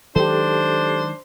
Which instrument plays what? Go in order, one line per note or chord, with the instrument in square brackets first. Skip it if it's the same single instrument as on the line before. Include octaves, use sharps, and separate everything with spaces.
[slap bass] D#3 F#3 G#3 [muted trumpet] D4 [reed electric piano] G4 A4 [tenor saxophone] C5